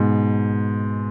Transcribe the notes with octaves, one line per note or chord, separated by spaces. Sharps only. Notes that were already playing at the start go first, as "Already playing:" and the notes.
Already playing: G#2 B2